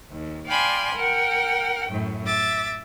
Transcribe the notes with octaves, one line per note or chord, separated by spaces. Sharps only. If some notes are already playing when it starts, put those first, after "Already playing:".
D#2
D5 F5 G5 G#5 B5 C6
A#4 F#5 G5
F#2 A2
E5 D6 A6